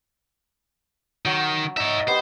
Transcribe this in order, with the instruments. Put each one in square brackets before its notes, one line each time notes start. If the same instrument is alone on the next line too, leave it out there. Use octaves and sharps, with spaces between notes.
[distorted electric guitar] D#3 [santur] F#3
[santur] D#4 [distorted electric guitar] C#5 E5
[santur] B3 G4 D#5 [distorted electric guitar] C5